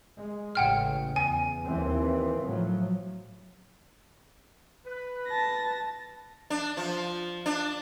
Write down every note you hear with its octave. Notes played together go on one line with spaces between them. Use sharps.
G#3
A1 C#3 F#5 G5 F6
E2 G#5
D#2 E3 C4
A2 F3 F#3
B4
A5 A#6
D4
F3
D4